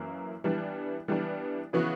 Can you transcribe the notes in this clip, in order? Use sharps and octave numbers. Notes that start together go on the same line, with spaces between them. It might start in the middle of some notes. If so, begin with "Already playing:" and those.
Already playing: F#2 E3 A#3
E3 G3 B3 D4
E3 G3 B3 D4
C#3 E3 B3 F#4